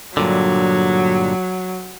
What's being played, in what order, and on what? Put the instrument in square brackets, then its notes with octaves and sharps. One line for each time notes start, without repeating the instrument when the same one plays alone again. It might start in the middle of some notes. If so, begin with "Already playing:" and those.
[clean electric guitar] G2 A#2 D3 [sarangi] F#3